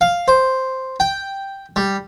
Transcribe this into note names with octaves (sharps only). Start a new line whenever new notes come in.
F5
C5
G5
G3